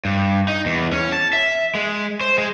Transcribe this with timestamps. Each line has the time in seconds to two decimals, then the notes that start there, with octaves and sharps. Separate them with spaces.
0.05 G2
0.48 D#4
0.66 E2
0.93 C#4
1.12 A5
1.33 E5
1.75 G#3
2.21 C5
2.38 G#3